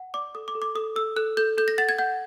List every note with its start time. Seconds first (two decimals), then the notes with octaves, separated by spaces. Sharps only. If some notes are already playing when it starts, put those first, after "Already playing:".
Already playing: F#5
0.14 D5 D6
0.35 A4 D#6
0.48 D6
0.55 A4
0.62 D6
0.75 A4 D#6
0.96 A4 E6
1.16 A4 F#6
1.37 A4 G6
1.58 A4 G6
1.68 A#6
1.78 F#5 A6
1.89 G#6
1.98 F#5 G6